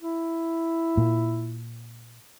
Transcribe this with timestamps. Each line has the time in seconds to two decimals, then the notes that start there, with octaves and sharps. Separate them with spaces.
0.01 E4
0.97 A#2